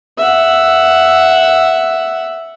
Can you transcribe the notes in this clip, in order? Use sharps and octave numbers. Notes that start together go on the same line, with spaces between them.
E5 F#5